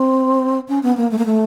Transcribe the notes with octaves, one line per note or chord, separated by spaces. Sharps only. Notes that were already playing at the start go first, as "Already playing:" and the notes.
Already playing: C4
C#4
B3
A#3
A3
A#3
A3